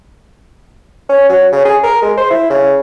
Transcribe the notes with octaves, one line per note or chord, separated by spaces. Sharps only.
C#4
F#3
C#3
G#4
A#4
G#3
C5
E4
C#3